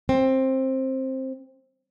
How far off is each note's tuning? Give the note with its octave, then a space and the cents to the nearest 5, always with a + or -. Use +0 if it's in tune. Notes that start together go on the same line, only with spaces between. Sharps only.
C4 +15